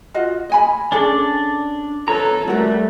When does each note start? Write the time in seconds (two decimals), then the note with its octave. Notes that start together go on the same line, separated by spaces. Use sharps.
0.14 F4 F#4 D#5
0.50 D#5 G#5 B5
0.92 C#4 D4 G#4 A4 D5
2.08 A4 B4 C#5 A#5
2.48 G3 A3 F#4 A#4 D5